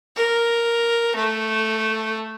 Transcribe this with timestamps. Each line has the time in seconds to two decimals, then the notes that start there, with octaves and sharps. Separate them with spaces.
0.16 A#4
1.15 A3